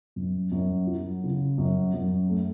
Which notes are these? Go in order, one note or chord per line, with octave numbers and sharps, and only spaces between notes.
F#2
F#2
F#3
C#3
F#2
F#2
A3